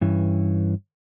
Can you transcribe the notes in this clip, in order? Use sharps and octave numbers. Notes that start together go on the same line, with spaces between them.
G2 E3 C#4